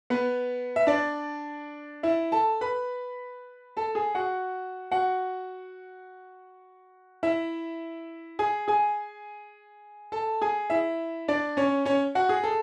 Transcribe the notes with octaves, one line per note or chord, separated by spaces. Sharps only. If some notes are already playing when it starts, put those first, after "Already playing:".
B3 B4
E5
D4 D5
E4 E5
A4 A5
B4 B5
A4 A5
G#4 G#5
F#4 F#5
F#4 F#5
E4 E5
G#4 G#5
G#4 G#5
A4 A5
G#4 G#5
E4 E5
D4 D5
C#4 C#5
C#4 C#5
F#4 F#5
G#4
A4